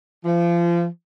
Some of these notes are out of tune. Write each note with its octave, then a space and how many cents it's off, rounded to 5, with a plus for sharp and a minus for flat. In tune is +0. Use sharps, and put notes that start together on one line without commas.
F3 -30